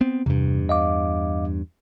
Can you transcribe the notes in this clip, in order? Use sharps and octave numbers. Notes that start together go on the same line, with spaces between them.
B3 C4
E2 G2 C3
D#5 F5 D6